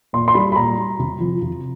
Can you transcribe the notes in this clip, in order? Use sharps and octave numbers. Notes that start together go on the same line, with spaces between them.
A#2 C6
C6
G3 B5
B5
A#2 A#5
G3
C3
F3
C3